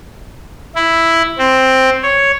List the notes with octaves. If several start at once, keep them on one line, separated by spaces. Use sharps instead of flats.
E4
C4
C#5